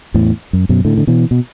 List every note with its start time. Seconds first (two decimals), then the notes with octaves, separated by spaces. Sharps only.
0.14 E2 A2
0.53 F#2
0.69 F#2 B2
0.85 A2 D3
0.97 D3
1.07 B2 E3
1.31 B2